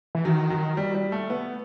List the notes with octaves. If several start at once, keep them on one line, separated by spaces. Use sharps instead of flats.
E3
D#3 F#3
F#3
G3
G3
A3
B3